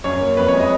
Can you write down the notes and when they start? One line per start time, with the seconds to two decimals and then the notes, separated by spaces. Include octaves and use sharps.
0.04 F#2 C#5
0.20 A#3
0.37 F2 B4
0.48 C#5
0.53 G#3
0.59 D#5